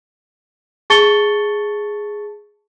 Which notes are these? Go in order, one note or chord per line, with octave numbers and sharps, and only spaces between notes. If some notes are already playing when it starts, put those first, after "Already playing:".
G#4 A5 C#6 A6 C#7 G7